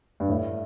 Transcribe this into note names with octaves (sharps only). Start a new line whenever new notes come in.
G2
A2